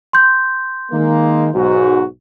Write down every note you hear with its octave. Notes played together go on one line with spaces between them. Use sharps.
C6 G6
D#3 G#3 A#3
B1 G#2 F#4